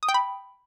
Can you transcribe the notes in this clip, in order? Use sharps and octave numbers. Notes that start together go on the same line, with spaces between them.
D#6
G5
B5